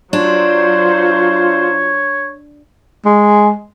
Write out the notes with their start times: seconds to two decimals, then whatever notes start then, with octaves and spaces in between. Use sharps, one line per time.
0.13 F#3 D4 F4 C5 C#5
3.05 G#3